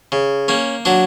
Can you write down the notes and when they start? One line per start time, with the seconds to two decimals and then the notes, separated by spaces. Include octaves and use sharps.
0.12 C#3
0.48 A#3 C#4
0.85 F#3 D4